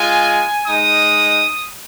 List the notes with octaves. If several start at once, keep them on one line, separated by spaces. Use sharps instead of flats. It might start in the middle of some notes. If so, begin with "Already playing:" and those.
Already playing: G#3 F4 G#5
G#3 D#4 D#6